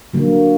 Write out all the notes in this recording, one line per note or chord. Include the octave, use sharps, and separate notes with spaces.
D3 F#3 A#3